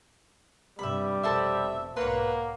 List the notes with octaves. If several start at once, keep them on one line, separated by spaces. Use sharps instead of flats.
G2 C3 G3 E5 B5
F1 B2 A4 C5 E5 C6
B1 G#2 A#3 B4 C#5 F#5 C6